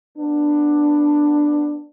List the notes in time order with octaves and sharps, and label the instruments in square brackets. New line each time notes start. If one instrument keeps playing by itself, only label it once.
[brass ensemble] B3 D4